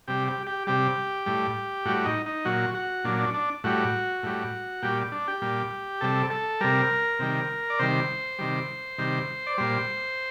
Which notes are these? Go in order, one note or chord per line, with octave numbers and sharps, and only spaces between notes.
C3 G3 G4
G4
G4
C3 G3 G4
A2 G3
A2 G3 F#4
D#4
D#4
A#2 F#3 F#4
F#4
A#2 F#3 D4
D4
D4
A2 G3 F#4
A2 G3
A#2 G3 G4
D4
G4
A#2 G3
C3 G3 A4
A4
C3 G3 A#4
C3 D#3 G3
D5
C3 D#3 G3 C5
C3 D#3 G3
C3 D#3 G3
D5
A#2 G3 C5